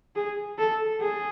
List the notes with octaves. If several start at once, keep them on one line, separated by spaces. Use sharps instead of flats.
G#4
A4
G#4